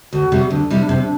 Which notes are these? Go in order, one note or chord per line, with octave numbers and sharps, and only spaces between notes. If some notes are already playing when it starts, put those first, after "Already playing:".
D2 F#4
C3 G3
D2 D4
C3 G3 E4
D4
C3 C4
D4